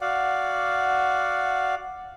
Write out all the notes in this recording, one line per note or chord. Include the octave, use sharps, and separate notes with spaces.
F#4 D5 F5 F#5